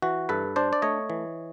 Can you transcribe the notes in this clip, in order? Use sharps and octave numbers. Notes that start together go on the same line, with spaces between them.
E3 F#4
G2 A4 B4
D4 C5 D5
D5
A3 C#5 D#5
E3